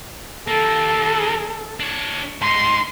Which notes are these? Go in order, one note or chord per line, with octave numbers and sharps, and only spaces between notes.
D#2 A#3 A4
D4 C#5
G#2 D#4 C6